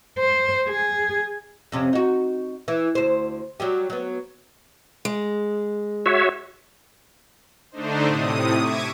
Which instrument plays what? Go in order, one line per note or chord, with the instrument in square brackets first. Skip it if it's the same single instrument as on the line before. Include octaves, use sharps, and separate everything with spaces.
[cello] C5
G#4
[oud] F2 C3 C#4
D#4 F#4
E3
D2 C5
F#3 G3 G4
F#3 B3
[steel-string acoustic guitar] G#3
[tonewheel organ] F#4 C#5 E5
[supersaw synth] D3 A3 D4 D#4 C5
A2 C3 D#6
E5 C#6 D6 G#6 D#7